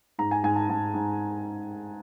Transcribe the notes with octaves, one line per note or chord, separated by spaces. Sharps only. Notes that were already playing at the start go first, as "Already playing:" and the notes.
G#2 A#5
G#5
G#2 G#5
A5
G#2 A5
G#2